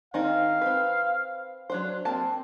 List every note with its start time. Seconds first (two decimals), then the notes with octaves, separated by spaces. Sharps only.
0.14 D#3 C4 D#4 F5
0.62 C4 B4
1.70 F#3 D4 C5
2.05 A#3 C4 A5